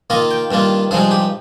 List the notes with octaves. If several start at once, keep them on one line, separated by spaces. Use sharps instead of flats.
D#3 A#3 F4 D#5
G5
G2 D#3 A#3 F4
G2 F3 G#3 D#4 G#4
G4